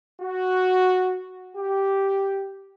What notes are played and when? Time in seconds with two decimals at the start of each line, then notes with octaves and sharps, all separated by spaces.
0.22 F#4
1.56 G4